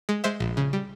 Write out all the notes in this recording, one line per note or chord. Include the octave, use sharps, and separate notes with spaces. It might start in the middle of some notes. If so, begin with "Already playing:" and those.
G#3
G#3 C5 E5
A#1
C#3
G3